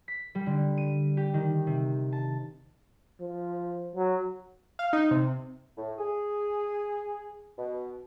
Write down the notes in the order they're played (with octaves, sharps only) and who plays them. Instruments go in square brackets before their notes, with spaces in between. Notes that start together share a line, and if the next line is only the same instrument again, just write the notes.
[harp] B6
G3
D3
D#7
G4
D#3
C3
A5
[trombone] F3
F#3
[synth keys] F5
D#4
C3
[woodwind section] A2
G#4
B2